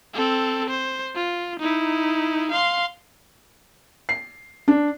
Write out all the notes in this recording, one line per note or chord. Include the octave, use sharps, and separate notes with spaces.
C4 A4
C5
F4
D#4 E4
F5 C6
C7
D4